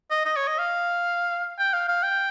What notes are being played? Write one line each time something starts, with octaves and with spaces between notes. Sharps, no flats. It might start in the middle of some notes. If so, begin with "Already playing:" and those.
D#5
D#5
C#5
D#5
F5
G5
F5
F5
G5